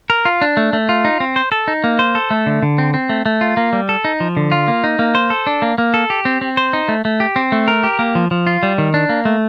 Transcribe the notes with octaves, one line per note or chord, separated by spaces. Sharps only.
A#4
F4
D4
A3
A3
F4
D#4
C4
C5
A4
D#4
A#3
C5
A4
A3
D3
D3
C4
C4
A3
A3
F4
A#3
G3
A4
D#4
F3
D3
F4
A#3
D#4
A#3
C5
A4
D4
A#3
A#3
A4
G4
C4
C4
C5
D#4
A3
A3
G4
C4
A3
A#4
G4
A#3
F3
F3
F4
G3
D#3
D4
A#3
A3